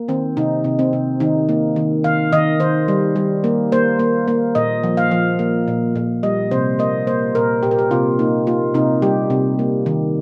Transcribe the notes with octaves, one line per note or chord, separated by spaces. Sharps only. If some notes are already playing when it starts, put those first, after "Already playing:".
Already playing: A#3
D#3 C4
C3 D#4
C3
C4
C3
D#3 D#4
A#3
D#3
D#3 F5
D#3 D#5
D#3 C5
G3
G3
A#3
A#3 C5
A#3
A#3
A#2 D#5
F3
F5
F3
A#3
A#2
A#2
G3 D#5
C3 C5
A#3 D#5
A#3 C5
A#2 A#4
A#2 G4
A#4
G4
C3 F4
A#3 D#4
A#3 F4
C3 D#4
G3 G4
C3
A#3
D#3